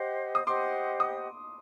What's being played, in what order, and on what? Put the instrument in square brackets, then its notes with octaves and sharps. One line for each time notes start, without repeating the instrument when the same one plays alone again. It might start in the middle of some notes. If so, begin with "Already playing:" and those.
Already playing: [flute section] G4 C5 D#5 F#5
[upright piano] D#6
[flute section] G4 C5 D#5 F#5 [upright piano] C6 D6
[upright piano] D#6